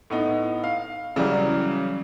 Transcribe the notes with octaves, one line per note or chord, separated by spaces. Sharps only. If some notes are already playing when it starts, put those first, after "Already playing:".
A2 B3 D#4
F5
C#3 E3 F#3 G3